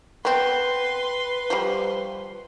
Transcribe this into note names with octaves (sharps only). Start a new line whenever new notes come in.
B3 C4 B4 C6
F3 G3